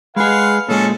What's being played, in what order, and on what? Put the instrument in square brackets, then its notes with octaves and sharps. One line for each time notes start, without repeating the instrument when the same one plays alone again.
[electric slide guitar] G#3 G#4 [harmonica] B4 F5 F#5
[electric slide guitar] A#2 G#3 [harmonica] C#4 A4